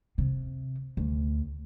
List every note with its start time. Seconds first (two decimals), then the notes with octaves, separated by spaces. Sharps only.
0.18 C3
0.97 D2